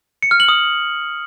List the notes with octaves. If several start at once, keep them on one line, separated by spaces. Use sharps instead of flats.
C#7
F6
F#7
D#6